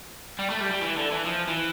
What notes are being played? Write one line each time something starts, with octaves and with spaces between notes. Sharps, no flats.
G3
A3
G3
G3
E3
D3
E3
F3
E3